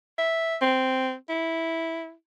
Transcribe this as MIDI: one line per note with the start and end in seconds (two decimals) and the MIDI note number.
0.18 0.56 76
0.62 1.14 60
1.29 2.13 64